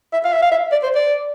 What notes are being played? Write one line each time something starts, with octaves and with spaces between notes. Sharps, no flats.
E5
F5
E5
F5
E5
D5
C5
D5